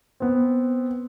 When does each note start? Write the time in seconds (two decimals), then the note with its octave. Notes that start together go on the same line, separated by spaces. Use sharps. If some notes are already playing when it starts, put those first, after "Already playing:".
0.20 B3 C4